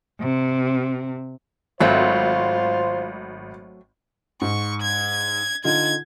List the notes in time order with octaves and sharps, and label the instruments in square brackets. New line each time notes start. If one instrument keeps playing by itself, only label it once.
[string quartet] C3
[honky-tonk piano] G#1 [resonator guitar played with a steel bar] F#3 A3 C4 [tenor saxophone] F4 [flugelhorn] C5
[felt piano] G#2 [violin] C#6
[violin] G#6
[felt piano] D3 D#4 F4 [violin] G#6